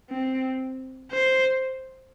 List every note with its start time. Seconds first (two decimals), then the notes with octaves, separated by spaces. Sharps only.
0.10 C4
1.12 C5